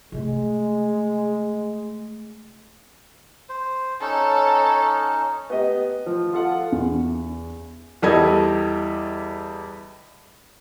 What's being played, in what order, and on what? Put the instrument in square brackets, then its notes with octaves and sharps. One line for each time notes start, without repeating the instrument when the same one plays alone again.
[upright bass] C3 A3 [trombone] G#3
[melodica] C5
[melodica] C#4 D#4 [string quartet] A4 C#5
[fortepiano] B3 G4 D#5
F3
F4 A4 F#5
[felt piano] E2
E2 G3 A4 D#5 G#6